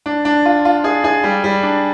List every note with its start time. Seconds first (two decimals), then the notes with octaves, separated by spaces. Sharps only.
0.06 D4
0.25 D4
0.45 F4
0.65 F4
0.84 G#4
1.04 G#4
1.24 G3
1.44 G3
1.63 D4